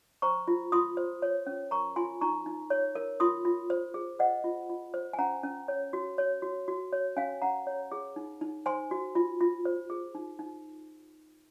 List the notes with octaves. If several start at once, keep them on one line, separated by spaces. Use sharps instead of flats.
C5 A#5 C#6
F4
F4 C6 D#6
C5
C#5
C#4
A#4 A#5 C#6
F4 G#5 C6
D#4 A#5 C#6
D#4
C#5
A#4
F4 C6 D#6
F4
C5
G#4
C5 D#5 F#5
F4
F4
C5
G#5
C#4 F#5 A#5
C#4
C#5
F#4
C#5
F#4
F#4
C#5
C#4 F5 G#5
C#4 F#5 A#5
C#5
G#4
D#4
D#4
C5 G#5 C6
F#4
F4
F4
C5
G#4
D#4
D#4